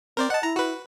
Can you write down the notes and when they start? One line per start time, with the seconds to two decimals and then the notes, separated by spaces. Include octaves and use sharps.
0.17 C4 A#4 C5 D5
0.30 D#5 F#5 A5
0.43 E4 A#5
0.56 F#4 B4